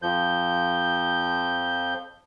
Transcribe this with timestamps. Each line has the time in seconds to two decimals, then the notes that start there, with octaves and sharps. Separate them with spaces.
0.02 F2 F3 G6